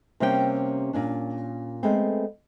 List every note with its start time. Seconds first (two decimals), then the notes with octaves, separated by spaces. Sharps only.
0.20 C3 G3 A#3 C#4 E4 G5
0.93 A#2 C#4 D4
1.83 G#3 A3 B3 C4